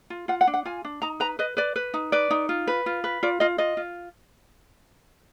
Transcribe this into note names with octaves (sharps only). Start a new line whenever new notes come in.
F4
F4 F#5
F#5
D4
F#5
F4 G#5
D4
D#4 A#5
B4 A#5
B4 D#5
B4 D5
B4
D#4
B4 D5
D#4
F4
B4
F4
B4
F4 D5
F4 D#5
F4 D#5
F4